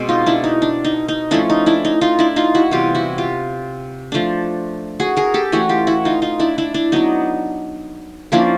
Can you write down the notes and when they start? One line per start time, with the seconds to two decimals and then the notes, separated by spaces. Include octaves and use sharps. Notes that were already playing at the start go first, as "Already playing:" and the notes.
Already playing: B2 G#3 C4
0.09 D#4 F4
0.26 D4 E4
0.44 D#4
0.62 D4
0.84 D#4
1.08 D#4
1.31 F3 A3 C#4 D4 E4
1.50 D#4
1.66 D4 E4
1.85 D#4
2.01 D#4 F4
2.19 D4 E4
2.36 D#4 F4
2.55 E4 F#4
2.71 C3 E3 G3 B3 F4 G4
2.95 E4 F#4
3.18 F4 G4
4.12 F3 A3 D4
5.00 F#4 G#4
5.17 G#4 A#4
5.34 G4 A4
5.52 E3 A3 C#4 F#4 G#4
5.69 F4 G4
5.87 E4 F#4
6.05 D#4 F4
6.22 D#4 F4
6.40 D4 E4
6.58 D4 E4
6.74 D4
6.92 F#3 B3 D4 D#4
8.32 F3 A#3 C#4 D4 E4